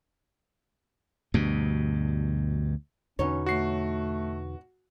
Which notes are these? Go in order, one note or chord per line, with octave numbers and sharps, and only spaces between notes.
D2 G2 B2
E2 B2 D3 C#4 D#4 C#5
A3 F#4 C7